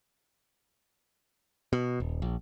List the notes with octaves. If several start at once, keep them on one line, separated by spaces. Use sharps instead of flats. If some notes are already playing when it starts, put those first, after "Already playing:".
B2
D#1
A#1